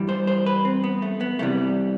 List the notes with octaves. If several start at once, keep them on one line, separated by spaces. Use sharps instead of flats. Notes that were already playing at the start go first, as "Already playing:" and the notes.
Already playing: G2 E3 G3
C5
C5
B4
C4
B3
A3
B3
C2 C3 E3 G3 A3